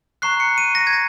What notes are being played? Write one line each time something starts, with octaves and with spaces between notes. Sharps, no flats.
A#5 C#6 F#6 C7
C#7
D#7
A#6
G#6
A#6